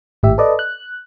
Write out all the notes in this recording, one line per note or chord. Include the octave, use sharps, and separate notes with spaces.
G#1 A2 G4 E5
A4 B4 D5 D#5
F#6